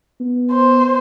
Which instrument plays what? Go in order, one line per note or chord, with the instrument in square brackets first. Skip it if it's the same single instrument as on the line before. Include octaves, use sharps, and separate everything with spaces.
[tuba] B3
[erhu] C5